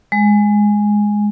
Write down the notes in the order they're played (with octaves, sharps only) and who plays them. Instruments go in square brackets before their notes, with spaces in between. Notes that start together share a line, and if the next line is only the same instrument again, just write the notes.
[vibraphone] G#3